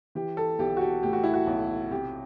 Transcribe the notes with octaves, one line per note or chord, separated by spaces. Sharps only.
E3 G4
A4
B1 G4
F#4
G4
A2 G4
F#4
E4
F#4
B1
C3 G4